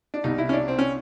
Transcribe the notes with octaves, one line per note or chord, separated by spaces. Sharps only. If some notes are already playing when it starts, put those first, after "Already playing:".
D4
C2 B2 G3 D#4
E4
C#4
D4
C4
C#4